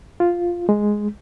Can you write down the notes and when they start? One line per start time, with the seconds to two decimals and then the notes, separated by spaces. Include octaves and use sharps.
0.20 F4
0.69 G#3